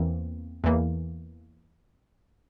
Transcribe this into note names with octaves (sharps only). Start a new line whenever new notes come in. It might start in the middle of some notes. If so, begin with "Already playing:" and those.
Already playing: E2 E3 A#3 C4
E2 E3 A#3